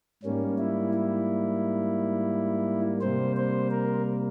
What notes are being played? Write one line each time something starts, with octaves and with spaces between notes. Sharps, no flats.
G#2 G3 A#3 C#4
E4
E4
C3 G3 A#3 C5
C5
A#4